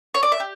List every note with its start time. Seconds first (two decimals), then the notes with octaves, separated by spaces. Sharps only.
0.14 C#5
0.23 D5
0.32 E5
0.40 G4